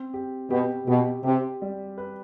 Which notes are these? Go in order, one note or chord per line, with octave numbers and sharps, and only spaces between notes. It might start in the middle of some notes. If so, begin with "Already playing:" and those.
Already playing: C4
G4
B2 G4
B2 G4
C3 G4
G3
B4